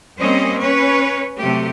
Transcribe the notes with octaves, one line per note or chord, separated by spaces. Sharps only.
G3 A#3 C4 C#4 C5 D#5
C#4 B4 C#5
C3 F#3 A3 G4